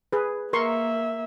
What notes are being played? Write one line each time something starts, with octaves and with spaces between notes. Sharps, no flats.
G#4 B4
A#3 A#4 E5 C6 C#6